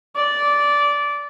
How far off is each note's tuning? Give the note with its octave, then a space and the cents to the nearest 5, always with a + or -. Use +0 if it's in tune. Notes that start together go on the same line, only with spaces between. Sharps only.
D5 -15